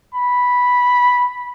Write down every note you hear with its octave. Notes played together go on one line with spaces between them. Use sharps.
B5